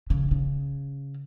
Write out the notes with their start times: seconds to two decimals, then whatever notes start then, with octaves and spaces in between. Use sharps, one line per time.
0.10 C#3
0.31 C#3